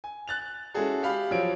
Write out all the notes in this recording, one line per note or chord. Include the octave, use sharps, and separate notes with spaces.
G#5
F#6 A6 F7
G#3 C#4 E4 F#4 G#4 A4
G4 F5 B5
F3 F#3 C#5 D7